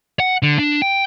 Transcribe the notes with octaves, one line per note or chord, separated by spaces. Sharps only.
F#5
D3
D4
G5